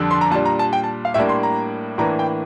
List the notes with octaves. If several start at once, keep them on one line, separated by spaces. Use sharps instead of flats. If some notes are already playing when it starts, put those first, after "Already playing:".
Already playing: F2 D3 G3 D4
C6
A#5
A#2 G3 D4 A5
A#5
A5
G5
A5
F5
A2 G3 A#3 D4 E5
C6
A#5
A2 E3 A#3 D4 A#5
G5